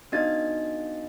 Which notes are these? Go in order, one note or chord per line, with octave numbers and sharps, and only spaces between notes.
B3 D4 D#4 F#4 D#5 A6